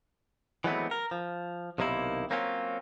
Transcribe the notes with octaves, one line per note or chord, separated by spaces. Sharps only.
E3 F#3 G#3 A3 B3 C4
A#4
F3
B1 C3 D#3 A#3 E4
F#3 A#3 C4 C#4 F4